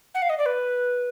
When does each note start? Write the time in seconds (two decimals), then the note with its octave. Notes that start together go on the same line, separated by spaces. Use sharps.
0.15 F#5
0.22 F5
0.30 D#5
0.38 D5
0.46 B4